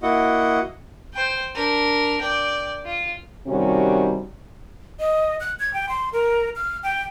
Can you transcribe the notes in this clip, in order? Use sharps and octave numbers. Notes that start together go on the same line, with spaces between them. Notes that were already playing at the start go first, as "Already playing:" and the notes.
A#3 E4 F#4 D#5 F#5
C5 G5
D4 A#4
D5 G5
F4
C3 D#3 G3 C#4 F#4
D#5
F#6
G#6
G5
C6
A#4
F6
G5